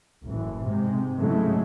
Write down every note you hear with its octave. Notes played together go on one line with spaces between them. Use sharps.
F#1 A2 E3
G#2 C3 G#3
G#2 C#3 E3 F#3 G#3 A3